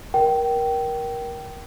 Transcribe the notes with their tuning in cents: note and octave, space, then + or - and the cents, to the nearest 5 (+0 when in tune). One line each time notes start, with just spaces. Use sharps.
A#4 +20 G5 -20